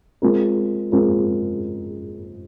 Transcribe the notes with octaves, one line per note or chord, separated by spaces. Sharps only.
G#3 C4 F4 A#4
G#3 C4 F4 A#4